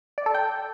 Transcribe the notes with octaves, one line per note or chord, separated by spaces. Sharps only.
D5
A4
G5